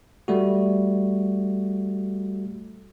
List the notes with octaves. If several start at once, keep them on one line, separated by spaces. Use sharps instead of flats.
G3 A3 F#4